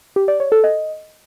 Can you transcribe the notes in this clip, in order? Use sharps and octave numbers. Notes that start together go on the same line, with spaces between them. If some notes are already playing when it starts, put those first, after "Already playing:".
G4
D5
C#5
A4
D#5